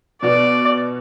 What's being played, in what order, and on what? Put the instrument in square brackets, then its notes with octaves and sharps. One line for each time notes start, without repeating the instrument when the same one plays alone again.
[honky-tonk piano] B2 B3 F#4 [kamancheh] D5